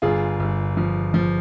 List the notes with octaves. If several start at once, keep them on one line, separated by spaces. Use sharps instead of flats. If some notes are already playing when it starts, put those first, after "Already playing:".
G1 F4 G#4
G1
F3
F3